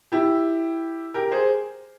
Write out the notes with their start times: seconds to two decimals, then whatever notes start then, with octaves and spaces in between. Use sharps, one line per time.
0.12 E4 G4
1.14 G4 A#4
1.32 G#4 C5